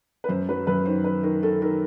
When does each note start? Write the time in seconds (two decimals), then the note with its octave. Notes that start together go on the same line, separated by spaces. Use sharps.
0.24 B4
0.29 F#2 C5
0.49 F#3 B4
0.67 F#2 B4
0.85 D#3 C5
1.04 D#3 B4
1.23 D#3 A#4
1.42 D#3 A4
1.61 D#3 A#4